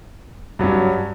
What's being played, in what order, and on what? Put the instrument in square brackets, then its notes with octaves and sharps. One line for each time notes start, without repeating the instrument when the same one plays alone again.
[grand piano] G2 F#3 C#4